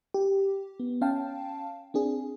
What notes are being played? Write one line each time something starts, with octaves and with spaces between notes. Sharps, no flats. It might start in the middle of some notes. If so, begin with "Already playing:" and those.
G4
B3
C#4 F5 G5 A5
C4 D4 G#4